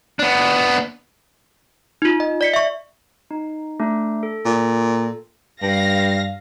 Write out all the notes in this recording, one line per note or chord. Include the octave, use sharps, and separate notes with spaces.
B3 D4
D#4 F4
D#5
D5 B6 C#7
E5 C#6
D#4
A3 D4
A4
A#2
G2 F5 A#6